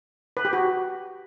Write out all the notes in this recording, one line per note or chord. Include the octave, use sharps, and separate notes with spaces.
B4
G4
F#4